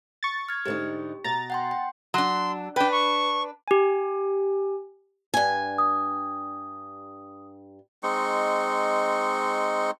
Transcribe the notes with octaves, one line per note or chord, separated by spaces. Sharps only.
C#6 A6
F6 G#6
G#2 D3 D#4 G4
B2 A#5 A6
F#5 G5 C6
G5
F#3 D4 C6
D4 B4 G5
C#6
G4 G#5
G2 G#5
D#6
G#3 C4 D#4 C#6